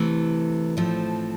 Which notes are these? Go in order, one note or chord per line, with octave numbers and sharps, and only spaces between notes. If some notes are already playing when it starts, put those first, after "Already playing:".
Already playing: C3 E3 A3
A2 F3 A3 C4